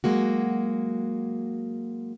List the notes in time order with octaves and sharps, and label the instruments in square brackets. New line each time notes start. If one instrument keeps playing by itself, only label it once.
[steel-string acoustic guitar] F#3 G#3 A#3 F#4